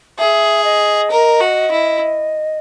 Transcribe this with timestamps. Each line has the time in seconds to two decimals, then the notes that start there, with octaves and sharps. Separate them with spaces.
0.19 G#4 E5
0.64 D#5
1.11 A#4
1.40 F#4
1.71 E4